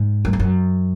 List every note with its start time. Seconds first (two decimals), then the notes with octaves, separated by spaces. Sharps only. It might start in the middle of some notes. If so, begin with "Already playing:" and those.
Already playing: G#2
0.25 F#2
0.33 F2
0.40 F#2